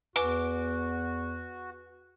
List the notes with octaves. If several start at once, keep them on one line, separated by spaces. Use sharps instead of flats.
E2 F#4 B4 G#5 D6